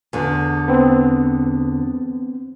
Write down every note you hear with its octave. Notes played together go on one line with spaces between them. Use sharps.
E2 D3
B3 C4